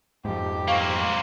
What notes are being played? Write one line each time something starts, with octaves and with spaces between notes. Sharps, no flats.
F2 G#2 G4
A#3 C4 F5 C#6